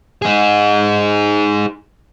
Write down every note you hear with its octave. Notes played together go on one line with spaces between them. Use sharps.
D#4 G#4